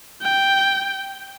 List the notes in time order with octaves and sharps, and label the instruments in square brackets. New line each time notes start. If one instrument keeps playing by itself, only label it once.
[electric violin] G5